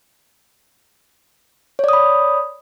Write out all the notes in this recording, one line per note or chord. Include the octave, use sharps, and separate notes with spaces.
C#5 D5 B5 D#6